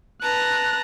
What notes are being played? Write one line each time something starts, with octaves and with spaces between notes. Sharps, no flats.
B4 A5 A#5 F#6